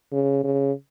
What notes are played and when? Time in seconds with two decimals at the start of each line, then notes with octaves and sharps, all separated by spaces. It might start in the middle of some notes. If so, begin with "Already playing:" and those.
0.12 C#3
0.44 C#3